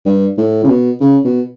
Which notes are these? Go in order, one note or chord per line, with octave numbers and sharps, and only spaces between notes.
G2
A2
C#3
B2
C#3
B2